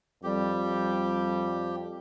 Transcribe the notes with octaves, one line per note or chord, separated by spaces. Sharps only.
F2 G3 G4